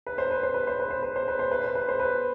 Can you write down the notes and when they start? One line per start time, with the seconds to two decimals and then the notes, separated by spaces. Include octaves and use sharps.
0.07 B4
0.18 C5
0.31 B4
0.43 C5
0.54 B4
0.67 C5
0.79 B4
0.90 C5
1.03 B4
1.16 C5
1.28 B4
1.39 C5
1.51 B4
1.64 C5
1.75 B4
1.89 C5
2.00 B4